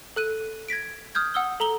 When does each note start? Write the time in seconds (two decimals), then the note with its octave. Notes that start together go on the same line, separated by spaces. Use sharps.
0.16 A4 F#6 D#7
0.68 G#6 A#6 B6 D7
1.15 D#6 F6 G6 G#6
1.34 F#5 D#6 E6 G7
1.60 A4 A#5 F#7 G7